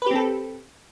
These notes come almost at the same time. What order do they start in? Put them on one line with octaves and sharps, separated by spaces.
B4 G4 C4 A4